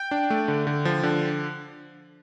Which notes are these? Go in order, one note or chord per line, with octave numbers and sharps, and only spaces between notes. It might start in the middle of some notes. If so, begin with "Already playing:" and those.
Already playing: G5
D4
A3
D3
D3
F3
D3